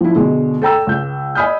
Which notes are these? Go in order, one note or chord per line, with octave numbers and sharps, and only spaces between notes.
F3 E4
B2 D3 G#3
A4 G5 A#5 E6
C#2 G6
D#5 G#5 B5 D#6 F6 G6